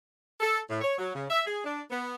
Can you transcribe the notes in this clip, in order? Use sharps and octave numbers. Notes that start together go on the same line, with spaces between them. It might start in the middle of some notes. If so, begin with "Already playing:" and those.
A4
A2
C#5
F#3
C#3
E5
G#4
D4
B3